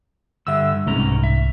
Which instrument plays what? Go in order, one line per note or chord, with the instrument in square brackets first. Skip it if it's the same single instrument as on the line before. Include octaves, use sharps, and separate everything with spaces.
[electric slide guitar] G2 D3 G3 [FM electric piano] E5 E6
[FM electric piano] C2 G#2 [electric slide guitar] B2 C#4 A#5
[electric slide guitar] E5